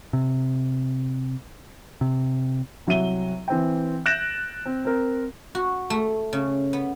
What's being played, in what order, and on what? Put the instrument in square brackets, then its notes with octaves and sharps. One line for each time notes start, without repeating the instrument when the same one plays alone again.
[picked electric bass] C3
C3
[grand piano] C2 F#3 E5 D#7 G7
E3 C4 G5
F#6 G6 A6 A#6 D7 E7
C4
C4 A#4
[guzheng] F#4
A3
C#3
B3